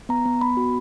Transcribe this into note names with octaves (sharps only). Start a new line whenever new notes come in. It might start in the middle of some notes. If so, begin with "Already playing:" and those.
B3 A#5
B3
B3 B5
F#4